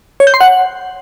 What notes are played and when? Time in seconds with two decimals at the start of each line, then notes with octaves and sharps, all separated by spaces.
0.20 C#5
0.27 G6
0.34 C6
0.41 F#5